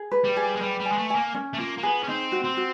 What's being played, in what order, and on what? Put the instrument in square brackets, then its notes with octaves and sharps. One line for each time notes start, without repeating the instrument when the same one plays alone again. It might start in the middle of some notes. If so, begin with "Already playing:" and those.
Already playing: [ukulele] G#4
B4
[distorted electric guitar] G3
[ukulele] G#4
[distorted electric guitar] G#3
[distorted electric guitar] G3 [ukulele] B4
[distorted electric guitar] G3
[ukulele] G#5
[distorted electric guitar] G#3
A3
[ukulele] G#5
[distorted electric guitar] A#3
[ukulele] C#4
[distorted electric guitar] A3
[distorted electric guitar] A#3 [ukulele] F4
[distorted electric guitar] A#3
[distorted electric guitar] B3 [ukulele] G#4
[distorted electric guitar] C#4
[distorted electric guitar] C4 [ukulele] D#4
[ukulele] F#4
[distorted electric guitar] C4
[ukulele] F#4